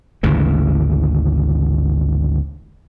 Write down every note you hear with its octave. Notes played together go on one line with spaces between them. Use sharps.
G#1 D2 C#3 E3